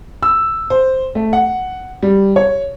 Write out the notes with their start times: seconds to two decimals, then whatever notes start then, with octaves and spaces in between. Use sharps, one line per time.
0.23 E6
0.70 C5
1.15 A3
1.33 F#5
2.03 G3
2.36 C#5